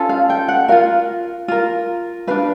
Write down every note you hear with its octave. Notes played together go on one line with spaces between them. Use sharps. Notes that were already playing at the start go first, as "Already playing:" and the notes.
Already playing: C#4 F4 A4
F5
G5
F#5
F4 A#4 F5
F4 A#4
D4 F#4 B4 F5